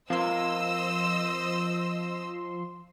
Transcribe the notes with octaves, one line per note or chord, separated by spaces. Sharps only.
F3 C4 A#4 C5 D#5 F5 C6 E6